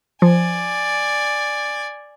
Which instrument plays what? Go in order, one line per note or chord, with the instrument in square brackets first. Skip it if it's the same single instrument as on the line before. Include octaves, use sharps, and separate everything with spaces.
[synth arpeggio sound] F3 [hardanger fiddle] D5 G#5